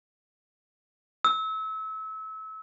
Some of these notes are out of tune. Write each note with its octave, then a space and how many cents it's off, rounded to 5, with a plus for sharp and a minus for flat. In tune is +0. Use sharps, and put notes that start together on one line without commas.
E6 -30